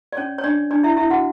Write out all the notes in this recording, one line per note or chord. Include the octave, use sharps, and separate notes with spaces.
D5
C#4 C#5
C#5
D4 D5
D4 D5
E4 E5
E4 E5
F#4 F#5